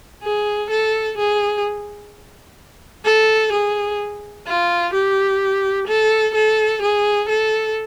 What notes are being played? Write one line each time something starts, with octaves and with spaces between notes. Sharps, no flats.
G#4
A4
G#4
A4
G#4
F4
G4
A4
A4
G#4
A4